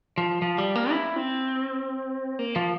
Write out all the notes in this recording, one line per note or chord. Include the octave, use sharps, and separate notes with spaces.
F3
F3
G3
A#3
E4
C4
A#3
F3